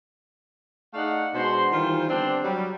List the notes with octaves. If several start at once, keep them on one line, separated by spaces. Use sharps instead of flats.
A3 D#4 G#4 D5 F5 F#5
B2 G#3 D4 F#4 C5 C6
D#3 E3 G3 F4 C5
D3 G3 B3 C4 D4
F#3 G3